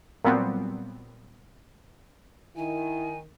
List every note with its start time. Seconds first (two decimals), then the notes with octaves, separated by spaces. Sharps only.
0.25 A#2 F#3 G3 B3 C4
2.56 D#3 E4 G#5